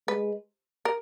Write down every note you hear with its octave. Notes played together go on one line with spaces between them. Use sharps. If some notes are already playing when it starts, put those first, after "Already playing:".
G#3 B4
A#4